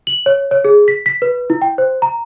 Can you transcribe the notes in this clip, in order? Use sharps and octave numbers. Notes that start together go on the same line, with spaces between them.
F#7
C#5
C#5
G#4
B6
B6
B4
E4
G5
C5
A#5